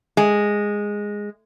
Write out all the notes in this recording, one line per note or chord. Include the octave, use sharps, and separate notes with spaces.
G#3